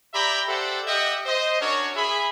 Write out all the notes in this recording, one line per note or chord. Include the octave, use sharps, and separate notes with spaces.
G4 D5 E5 G5 A#5 B5
G4 A4 C5 D5 E5 F#5
G4 D#5 E5 F#5 G5
C5 D#5
C#4 D4 F#4 A#4 C#5
G#4 E5 B5